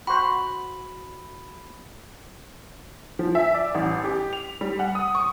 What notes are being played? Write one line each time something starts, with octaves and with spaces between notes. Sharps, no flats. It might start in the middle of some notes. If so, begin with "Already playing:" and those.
F#4 C5 B5
F3
E5
D5
A1
G4
F7
G3
F#5
D#6
C#6